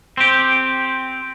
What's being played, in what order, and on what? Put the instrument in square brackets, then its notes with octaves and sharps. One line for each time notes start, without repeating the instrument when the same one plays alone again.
[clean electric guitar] C4 G4